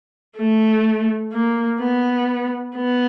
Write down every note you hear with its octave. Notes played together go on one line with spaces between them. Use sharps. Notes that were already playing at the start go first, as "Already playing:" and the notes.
A3
A#3
B3
B3